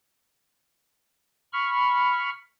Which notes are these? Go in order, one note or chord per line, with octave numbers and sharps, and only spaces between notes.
B5 C#6 F6